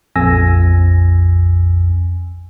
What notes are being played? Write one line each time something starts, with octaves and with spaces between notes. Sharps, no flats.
A#1 F2 G#5 E6 A#6